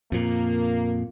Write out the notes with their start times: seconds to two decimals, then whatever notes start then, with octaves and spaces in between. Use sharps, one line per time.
0.12 F2 A#2 A#3